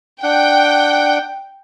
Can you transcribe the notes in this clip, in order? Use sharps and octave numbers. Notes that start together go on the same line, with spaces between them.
D4 F#5 G5